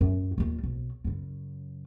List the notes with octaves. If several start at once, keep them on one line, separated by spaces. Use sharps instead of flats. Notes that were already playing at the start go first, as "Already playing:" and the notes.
F#2
D#2 F4
B1
F#2 C#3